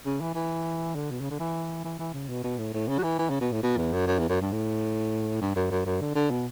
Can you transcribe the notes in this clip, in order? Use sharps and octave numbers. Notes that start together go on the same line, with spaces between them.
C#3
E3
E3
D3
B2
C#3
D3
E3
E3
E3
C#3
B2
B2
A2
A2
C#3
F#3
E3
E3
C#3
B2
A2
B2
E2
F#2
F#2
E2
F#2
G2
A2
G2
F#2
F#2
F#2
D3
D3
B2